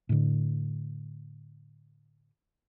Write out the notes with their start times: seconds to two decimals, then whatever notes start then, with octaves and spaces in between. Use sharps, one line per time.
0.09 A2 D3